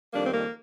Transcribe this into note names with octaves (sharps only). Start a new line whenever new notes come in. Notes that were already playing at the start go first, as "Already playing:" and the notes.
F2 D#3 G3 A#3 D4
C4
A#3